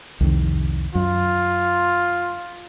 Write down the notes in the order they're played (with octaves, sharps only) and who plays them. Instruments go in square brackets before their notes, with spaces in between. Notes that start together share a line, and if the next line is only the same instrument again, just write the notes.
[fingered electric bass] C2 F2 D#3
[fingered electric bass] F#2 [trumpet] F4